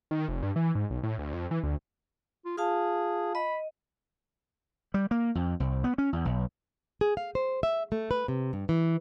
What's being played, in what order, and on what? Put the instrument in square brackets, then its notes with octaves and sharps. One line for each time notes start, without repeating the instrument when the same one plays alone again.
[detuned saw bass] D#3
F1
G2
E3
G#2
B1
A2
D2
F2
E3
D2
[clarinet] F4
[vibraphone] F4 F5 A5 [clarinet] G#4
[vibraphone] D#5 [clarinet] B5
[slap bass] G3
A#3
F2
C2
B3
C#4
E2
B1
[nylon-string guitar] G#4
F5
C5
E5
A3
B4
C3
G2
E3